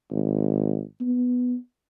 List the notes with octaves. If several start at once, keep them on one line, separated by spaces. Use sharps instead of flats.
G#1
B3